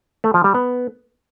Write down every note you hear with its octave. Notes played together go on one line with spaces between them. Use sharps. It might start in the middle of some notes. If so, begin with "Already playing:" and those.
A3
F3
G3
B3